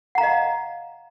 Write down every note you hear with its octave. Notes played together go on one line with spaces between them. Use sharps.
D#5 F5 F#5 A#5